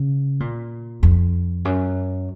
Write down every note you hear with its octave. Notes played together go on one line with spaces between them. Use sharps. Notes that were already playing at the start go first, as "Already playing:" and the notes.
Already playing: C#3
A#2
F2
F#2